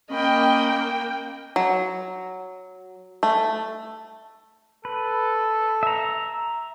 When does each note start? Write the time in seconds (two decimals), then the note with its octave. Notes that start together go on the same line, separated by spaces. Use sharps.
0.11 A#3 C#4 D#5 G5 B5
1.56 F#3
3.23 A3
4.85 A4 B4
5.83 E5 A#5